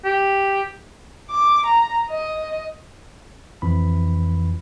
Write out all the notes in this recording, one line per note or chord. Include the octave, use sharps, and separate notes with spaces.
G4
D6
A#5
D#5
F2 E3 B5